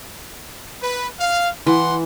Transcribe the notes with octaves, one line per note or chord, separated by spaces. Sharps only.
B4
F5
E3 F#5 C6